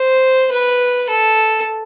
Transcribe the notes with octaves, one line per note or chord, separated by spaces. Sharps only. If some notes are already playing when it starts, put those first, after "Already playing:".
Already playing: C5
B4
A4